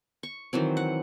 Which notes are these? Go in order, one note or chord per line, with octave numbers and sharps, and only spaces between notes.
C#6
D#3 E3 F#3 C4
F#5